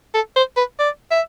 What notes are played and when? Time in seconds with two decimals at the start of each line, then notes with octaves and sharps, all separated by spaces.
0.14 A4
0.36 C5
0.57 B4
0.79 D5
1.11 E5